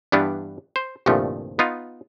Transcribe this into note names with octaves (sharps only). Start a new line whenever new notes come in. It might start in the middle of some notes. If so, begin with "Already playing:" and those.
G2 E3 G3 B3 D4
C5
C2 G2 A#2 D#3 F3 A3
B3 D#4 F4